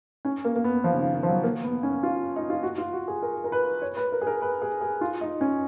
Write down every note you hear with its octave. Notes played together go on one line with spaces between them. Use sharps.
C#4
A#3
A#3
B3
F3
C#3
D#3
D#3
F3
F#3
A#3
B3
C#4
F4
D#4
F4
F#4
F4
F#4
G#4
A#4
A#4
B4
C#5
B4
A#4
G#4
A#4
B4
G#4
G#4
F4
D#4
C#4